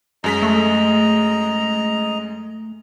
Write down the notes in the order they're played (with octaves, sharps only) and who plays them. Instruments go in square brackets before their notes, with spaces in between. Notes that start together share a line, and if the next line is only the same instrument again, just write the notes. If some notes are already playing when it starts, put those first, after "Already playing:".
[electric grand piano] F#2 G#3 B6 [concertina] D#5 A#5
[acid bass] A3